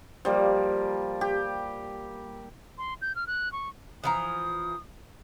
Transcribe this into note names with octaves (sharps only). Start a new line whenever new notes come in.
F3 G3 A#3
G4
C6
G6
F6
F#6
C#6
E3 F3 A#5 D#6